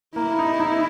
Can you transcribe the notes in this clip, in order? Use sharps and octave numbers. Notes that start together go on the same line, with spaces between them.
A#3 E4
D#4
D#4